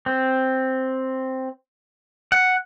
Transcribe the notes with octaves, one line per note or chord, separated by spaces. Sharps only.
C4
F#5